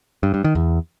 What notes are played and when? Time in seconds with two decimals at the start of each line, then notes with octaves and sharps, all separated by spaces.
0.23 G2
0.34 G2
0.44 D#3
0.55 E2